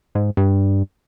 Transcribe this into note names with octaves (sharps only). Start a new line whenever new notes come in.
G#2
G2